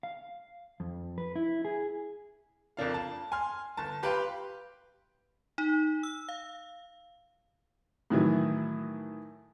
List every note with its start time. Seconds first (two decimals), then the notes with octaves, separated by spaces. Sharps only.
0.03 F5
0.80 F2
1.18 B4
1.36 E4
1.65 G#4
2.77 F2 A#3 D4 F5
2.94 A5
3.32 G#5 C6 F6
3.77 G1 A5
4.03 G4 B4 F5 G5 B5 C6
5.58 D#4
6.03 E6
6.29 F5
8.10 A2 D#3 E3 F#3